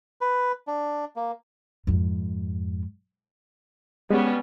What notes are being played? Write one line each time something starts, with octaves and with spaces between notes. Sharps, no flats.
B4
D4
A#3
F2 G#2
G3 G#3 B3 C#4